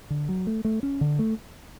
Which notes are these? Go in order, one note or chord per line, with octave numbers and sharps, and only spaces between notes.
D3
F#3
A3
A3
C#4
D3
A3